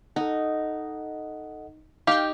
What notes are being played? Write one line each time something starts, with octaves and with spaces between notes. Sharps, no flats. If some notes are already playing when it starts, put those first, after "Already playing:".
D#4 A4 D#5 F#5
D#4 G4 F5 G5